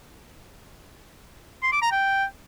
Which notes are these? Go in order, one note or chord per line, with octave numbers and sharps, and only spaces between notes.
C6
D6
A#5
G5